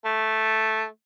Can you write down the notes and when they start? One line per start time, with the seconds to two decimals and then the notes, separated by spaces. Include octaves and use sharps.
0.05 A3